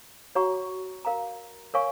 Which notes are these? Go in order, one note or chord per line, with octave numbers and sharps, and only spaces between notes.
F#4 C#5 F#5 A#5 C#6
A#4 F5 A#5
A#4 C#5 F5 G#5 C#6